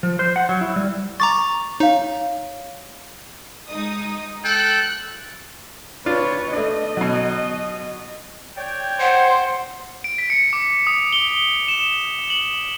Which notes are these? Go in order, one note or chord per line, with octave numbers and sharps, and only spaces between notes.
F3
C5
F#5
F#3
E4
G3
A#5 C#6 D6 A6
D#4 C#5 F5
G#3 D#4 D#6
A4 G5 F#6
D4 F4 B4 C#5
A3 D4 D#5
B2 F#3
C#5 D5 G5
C5 F#5
D7
B6
C#7
D6
D#6
G7
E7
F#7